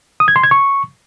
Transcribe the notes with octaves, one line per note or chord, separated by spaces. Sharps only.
D#6
G#6
C6
G#6
C#6